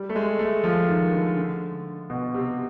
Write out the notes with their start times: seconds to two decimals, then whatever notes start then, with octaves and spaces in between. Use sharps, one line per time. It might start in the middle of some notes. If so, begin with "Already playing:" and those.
Already playing: G3
0.09 A3
0.15 G#3
0.39 A3
0.64 F3
0.88 D#3
1.12 D3
1.37 D3
2.10 B2
2.34 C3